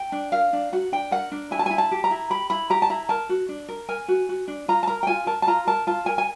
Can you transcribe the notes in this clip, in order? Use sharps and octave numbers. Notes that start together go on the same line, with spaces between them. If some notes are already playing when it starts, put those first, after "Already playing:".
Already playing: G5
D4
A#4 F5
D4
F#4 F#5
D4 G5
A#4 F#5
D4
E4 G#5
A5
E4 G#5
A5
G4
A#5
E4
G4 B5
E4 B5
G4 A#5
A5
E4 A#5
A#4 A5
F#4
D4
A#4
A#4 G#5
F#4
F#4
D4
F4 A#5
A5
A#4 A#5
G5
F4 G#5
A#4 A5
A5
F4 A#5
A#4 A5
F4 A5
A#4 G#5
G#5